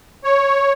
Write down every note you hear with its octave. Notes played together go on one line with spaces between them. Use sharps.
C#5